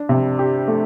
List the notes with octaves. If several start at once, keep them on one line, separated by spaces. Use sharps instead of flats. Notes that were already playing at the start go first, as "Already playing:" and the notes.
Already playing: D4
C3
G4
A3